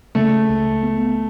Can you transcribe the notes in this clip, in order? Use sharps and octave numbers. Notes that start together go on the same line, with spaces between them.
C#3 A3
C#2
B3